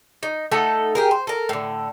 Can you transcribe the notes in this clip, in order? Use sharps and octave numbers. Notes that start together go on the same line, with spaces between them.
D#4
A3 D#4 A4 F#5
G4 G#4 A#4
C5
A4 A#4
A2 D3